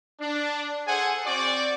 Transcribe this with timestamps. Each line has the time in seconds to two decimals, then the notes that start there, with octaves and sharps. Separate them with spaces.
0.20 D4
0.88 G#4 A4 C5 F#5 G#5
1.26 C4 F#4 D5